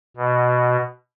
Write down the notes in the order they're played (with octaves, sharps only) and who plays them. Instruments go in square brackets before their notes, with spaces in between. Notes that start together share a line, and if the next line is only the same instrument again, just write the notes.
[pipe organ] B2